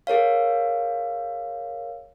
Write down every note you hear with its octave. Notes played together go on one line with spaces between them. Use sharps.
G#4 A#4 C#5 F5